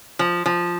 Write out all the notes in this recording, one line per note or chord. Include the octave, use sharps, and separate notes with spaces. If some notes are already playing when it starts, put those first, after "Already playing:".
F3
F3